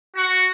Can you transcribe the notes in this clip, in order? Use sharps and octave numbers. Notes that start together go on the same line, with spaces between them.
F#4